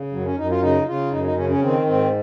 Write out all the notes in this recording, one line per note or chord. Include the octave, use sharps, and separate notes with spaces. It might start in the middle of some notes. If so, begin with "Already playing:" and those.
Already playing: C#3
F#2 F#3
C#4
F#2 D#4
F4
C#3 D#4
C#3 F4
F#2 D#4
D#4
C#3 C#4
C#4
D#3 C4
G#2 C4